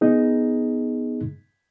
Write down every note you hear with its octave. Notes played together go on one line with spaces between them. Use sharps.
B3 D#4 G#4